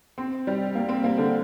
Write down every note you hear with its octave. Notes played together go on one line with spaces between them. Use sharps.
C4
G3
A#3
C4
A#3
D3